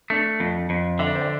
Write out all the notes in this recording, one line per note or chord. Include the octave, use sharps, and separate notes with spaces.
A3 D4
F2
F2
D3 E5
D5
C5
D5